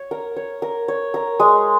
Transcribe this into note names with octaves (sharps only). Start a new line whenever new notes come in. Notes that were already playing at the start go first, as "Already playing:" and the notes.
Already playing: C#5
A#4
C#5
A#4
C#5
A#4
G#3